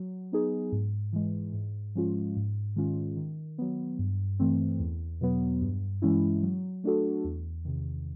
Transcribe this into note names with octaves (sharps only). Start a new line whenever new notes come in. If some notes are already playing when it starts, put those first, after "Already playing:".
Already playing: F#3
B3 D#4 G#4
G#2
E3 G#3
G#2
F3 G#3 C#4 F4
G#2
D#3 G#3 C#4 F4
D#3
F#3 B3
G2
E3 A3 C4
E2
B2 F#3 B3
G2
E3 G#3 C#4 E4
F#3
A3 D4 F#4 A4
E2
C3 D#3